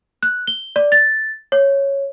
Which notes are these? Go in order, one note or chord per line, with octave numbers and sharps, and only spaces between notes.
F#6
G7
D5
A6
C#5